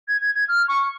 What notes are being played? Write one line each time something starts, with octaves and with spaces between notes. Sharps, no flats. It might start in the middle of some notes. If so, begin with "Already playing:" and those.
G#6
G#6
G#6
F6
C#6